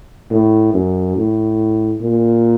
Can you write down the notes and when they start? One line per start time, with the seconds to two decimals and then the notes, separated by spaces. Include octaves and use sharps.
0.31 A2
0.74 F#2
1.17 A2
2.02 A#2